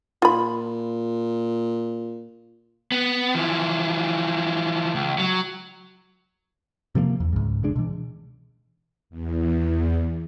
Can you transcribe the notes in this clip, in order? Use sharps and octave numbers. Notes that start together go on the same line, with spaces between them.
A#2 F4 B5
B3
E3 F3
C#2
F#3
C3 F3 G3 A#3
E2
C#2 G#2
E1 C#2 G#3 D4
B2 E3
E2